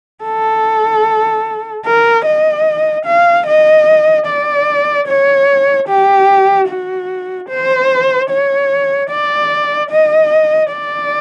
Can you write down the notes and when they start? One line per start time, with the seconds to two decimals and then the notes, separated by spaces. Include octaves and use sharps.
0.25 A4
1.86 A#4
2.25 D#5
3.06 F5
3.47 D#5
4.27 D5
5.08 C#5
5.88 G4
6.68 F#4
7.49 C5
8.30 C#5
9.10 D5
9.91 D#5
10.72 D5